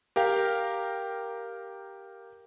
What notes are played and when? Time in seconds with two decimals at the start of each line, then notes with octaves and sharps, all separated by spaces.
0.16 G4 A#4 F5 G5